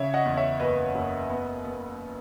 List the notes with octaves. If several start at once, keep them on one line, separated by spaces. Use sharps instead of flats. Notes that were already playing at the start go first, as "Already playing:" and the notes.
Already playing: C#3 C#5 E5
D#5 F#5
E2
C#5 E5
F#1 B4 D#5
F#1
B3
B3